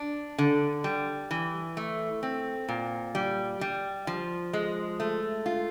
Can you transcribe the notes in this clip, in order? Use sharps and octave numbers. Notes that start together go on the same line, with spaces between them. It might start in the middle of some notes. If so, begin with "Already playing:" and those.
Already playing: D4
D3
G3
E3
A3
C4
A#2
G3
G3
F3
G#3
A3
F4